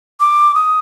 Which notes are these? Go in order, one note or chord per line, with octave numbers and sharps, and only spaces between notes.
D6
D#6